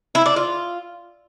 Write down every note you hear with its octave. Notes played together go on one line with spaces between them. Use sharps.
E4
D4
F4